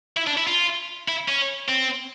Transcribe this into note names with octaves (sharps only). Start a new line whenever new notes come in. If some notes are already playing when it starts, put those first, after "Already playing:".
E4
D4
E4
F4
E4
C#4
C4